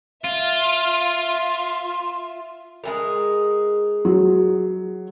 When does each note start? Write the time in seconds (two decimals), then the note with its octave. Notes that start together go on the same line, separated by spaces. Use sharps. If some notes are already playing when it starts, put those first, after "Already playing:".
0.25 F4 E5
2.84 G#3 G#4 A#4
4.05 F#3